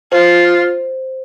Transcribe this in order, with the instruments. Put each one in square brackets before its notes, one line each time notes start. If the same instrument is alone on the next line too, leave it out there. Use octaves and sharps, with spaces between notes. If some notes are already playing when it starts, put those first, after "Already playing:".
[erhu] F4 [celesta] C5